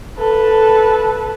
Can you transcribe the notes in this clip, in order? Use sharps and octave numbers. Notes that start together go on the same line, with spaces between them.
A4 B4